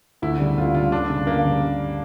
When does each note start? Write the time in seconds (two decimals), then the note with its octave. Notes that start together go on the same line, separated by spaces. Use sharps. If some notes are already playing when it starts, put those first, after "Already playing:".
0.22 D2 E4
0.39 C#3 G3
0.58 D2 F4
0.74 C#3 G3 F4
0.92 D2 D4
1.10 C#3 G3
1.27 D2 A#3
1.45 C#3 G3